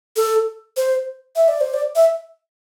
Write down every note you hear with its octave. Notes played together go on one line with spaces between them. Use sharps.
A4
C5
E5
D5
C5
D5
E5